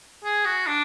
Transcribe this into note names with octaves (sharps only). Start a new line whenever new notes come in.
G#4
F#4
D4